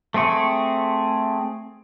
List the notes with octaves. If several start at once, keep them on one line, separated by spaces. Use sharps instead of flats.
A3 C4 G#4 C#6